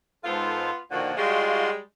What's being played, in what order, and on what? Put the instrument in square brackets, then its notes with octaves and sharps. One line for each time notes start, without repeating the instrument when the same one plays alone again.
[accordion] G#2 A4 C5 [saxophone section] B3 F4
[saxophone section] A#2 D3 F3 [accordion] D#3 F#4
[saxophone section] G3 G#3 [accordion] F4 F#4 C6